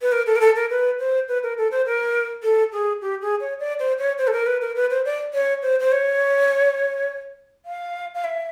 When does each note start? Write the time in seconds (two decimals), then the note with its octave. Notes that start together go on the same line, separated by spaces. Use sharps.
0.02 B4
0.12 A#4
0.26 A4
0.36 A#4
0.40 A4
0.56 A#4
0.70 B4
0.99 C5
1.28 B4
1.43 A#4
1.58 A4
1.71 C5
1.86 A#4
2.43 A4
2.73 G#4
3.01 G4
3.22 G#4
3.40 C#5
3.60 D5
3.79 C5
3.98 C#5
4.18 C5
4.27 A4
4.33 A#4
4.46 B4
4.61 A#4
4.75 B4
4.90 C5
5.05 D5
5.34 C#5
5.62 C5
5.80 C5
5.92 C#5
7.65 F5
8.14 F5
8.24 E5